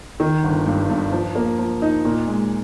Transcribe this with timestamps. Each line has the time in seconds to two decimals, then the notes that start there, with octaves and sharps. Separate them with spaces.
0.20 D#3
0.43 G1
0.66 G2
0.89 G2
1.12 F3
1.35 A#3
1.58 F3
1.82 D#4
2.05 A#2
2.27 G#3